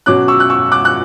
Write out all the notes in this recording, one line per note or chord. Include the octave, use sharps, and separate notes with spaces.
B2 F#3 C#4 D6 F#6
C#6 E6
F#6
C#6 E6
D6 F#6
F#6